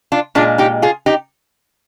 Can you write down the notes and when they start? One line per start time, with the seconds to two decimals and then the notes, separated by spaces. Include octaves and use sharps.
0.12 D4 F4
0.35 A#2 G#3 D4 F4
0.58 D#4 G4
0.82 F4 G#4
1.06 D#4 G4